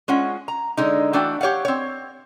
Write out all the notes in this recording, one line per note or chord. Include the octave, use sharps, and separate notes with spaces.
G#3 C#4 F4 F#5
A#5
D3 G#3 D#4
E3 A3 D4 F#4 G5
G4 C#5 F5 F#5
C4 C#5